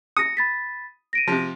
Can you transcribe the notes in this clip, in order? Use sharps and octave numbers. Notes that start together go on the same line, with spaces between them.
D#6 A#6 C#7
B5 A6 B6
A#6 D7 D#7
C3 F3